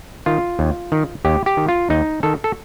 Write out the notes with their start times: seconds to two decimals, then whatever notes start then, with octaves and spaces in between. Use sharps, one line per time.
0.26 D#3 F4
0.59 D#2
0.92 D#3
1.25 D#2 G4
1.46 G4
1.57 D#3
1.69 F4
1.90 D#2 D#4
2.23 D#3 A4
2.44 A4